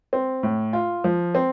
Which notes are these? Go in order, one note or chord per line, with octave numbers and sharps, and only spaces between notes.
C4
A2
F4
F3
C4